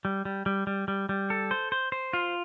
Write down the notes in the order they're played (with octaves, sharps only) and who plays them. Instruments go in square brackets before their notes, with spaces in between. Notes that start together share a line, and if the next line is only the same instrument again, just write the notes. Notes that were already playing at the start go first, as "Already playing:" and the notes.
[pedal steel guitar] G3
G3
G3
G3
G3
G3
A4
C5
C5
C5
F4